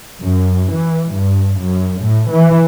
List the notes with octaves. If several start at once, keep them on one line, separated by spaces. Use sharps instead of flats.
F#2
E3
G2
F#2
A2
E3